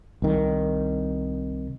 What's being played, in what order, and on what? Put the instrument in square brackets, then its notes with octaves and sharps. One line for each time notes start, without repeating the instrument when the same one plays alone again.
[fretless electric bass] C2 D#3